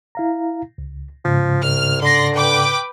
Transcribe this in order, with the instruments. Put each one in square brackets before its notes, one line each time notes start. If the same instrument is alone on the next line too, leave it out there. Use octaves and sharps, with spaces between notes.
[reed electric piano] E4 F5 A#5
C#2
[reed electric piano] G#2 C#3 [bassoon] F3
[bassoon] C2 [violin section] F6
[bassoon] D3 [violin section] D5 C6 A#6
[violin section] B4 G5 D6